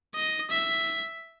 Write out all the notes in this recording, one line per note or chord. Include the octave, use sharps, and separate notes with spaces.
D#5
E5